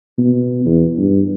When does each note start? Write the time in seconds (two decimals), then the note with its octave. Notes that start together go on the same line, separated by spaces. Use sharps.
0.18 B2
0.65 E2
0.98 G2